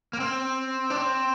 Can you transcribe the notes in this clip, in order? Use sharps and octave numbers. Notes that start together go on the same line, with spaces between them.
A#3
C4
D4
C4